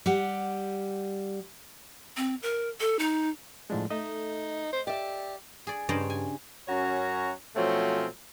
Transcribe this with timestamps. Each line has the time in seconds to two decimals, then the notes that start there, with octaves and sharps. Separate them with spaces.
0.06 G3 G4 F#5
2.17 C4
2.43 A#4
2.80 A4
2.99 D#4
3.70 A2 F3 G#3 D4
3.90 A3 D#4 D#5
4.73 C5
4.87 G4 D5 E5
5.67 G#4 D5
5.89 G2 C#3 C5 D5 D#5 A#5
6.10 G#5
6.68 F#2 C#4 F#4 C#5 A#5
7.56 B2 F3 F#3 A3 C4 C#4